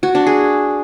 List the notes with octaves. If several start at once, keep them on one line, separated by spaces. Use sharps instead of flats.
F#4
D4
G#4